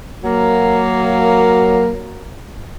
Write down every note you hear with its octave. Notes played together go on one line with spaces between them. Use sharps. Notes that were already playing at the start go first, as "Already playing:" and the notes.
F#3 A#3